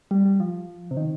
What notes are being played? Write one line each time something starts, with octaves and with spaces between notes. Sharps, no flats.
G3
G3
F3
C3
D#3